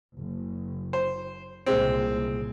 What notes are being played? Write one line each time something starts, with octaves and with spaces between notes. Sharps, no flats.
F#1
C5
C2 A#2 C#3 G#3 C4